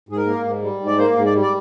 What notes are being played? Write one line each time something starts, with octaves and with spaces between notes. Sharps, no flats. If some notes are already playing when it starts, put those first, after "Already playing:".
G#2 G#4
A#4
A#3
G#2
G3
G#2
D5
A#3 C5
G#2
D5
G3
D5